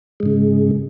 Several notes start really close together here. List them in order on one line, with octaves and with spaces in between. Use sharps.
G#3 G#2 C#3